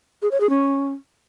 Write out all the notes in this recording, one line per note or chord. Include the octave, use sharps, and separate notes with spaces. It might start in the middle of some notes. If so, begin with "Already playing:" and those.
G#4
C#5
G#4
C#4